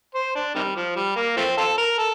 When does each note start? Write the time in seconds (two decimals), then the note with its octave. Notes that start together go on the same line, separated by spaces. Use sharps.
0.15 C5
0.35 D4
0.55 C3 D#3 G3
0.77 F3
0.96 G3
1.16 A#3
1.37 F3 A3 C4
1.58 C4 F4 A4
1.78 A#4
1.98 A4